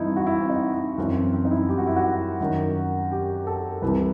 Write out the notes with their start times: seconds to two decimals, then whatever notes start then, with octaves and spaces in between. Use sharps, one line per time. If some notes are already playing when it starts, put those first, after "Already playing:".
Already playing: G2 E3 C4 D#4 E4
0.16 F#4
0.27 E4
0.40 C4
0.50 D#4
0.74 E4
0.98 F#2 E3 C4
1.15 C4
1.33 C4
1.45 D#4
1.51 E4
1.69 G4
1.78 F#4
1.87 E4
1.96 F#4
2.40 F#2 D#3
3.12 G4
3.47 A4
3.82 C2 C3 E3 B4